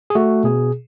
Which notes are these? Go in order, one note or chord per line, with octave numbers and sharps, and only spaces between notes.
G#4
A3 F#4
B2 G#4